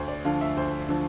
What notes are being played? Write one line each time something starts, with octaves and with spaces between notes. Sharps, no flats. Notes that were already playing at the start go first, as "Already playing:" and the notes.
Already playing: D2 C5
D5
D3 F3 F5
E5
D2 C5
D3 F3